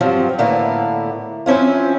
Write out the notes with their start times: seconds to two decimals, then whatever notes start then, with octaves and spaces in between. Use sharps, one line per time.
0.01 G2 F3 F#3 C4
0.38 A2 D3 A#3 B3 E4
1.46 F3 C4 C#4 E4 F4